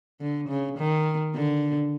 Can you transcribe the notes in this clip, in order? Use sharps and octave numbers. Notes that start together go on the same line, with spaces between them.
D3
C#3
D#3
D3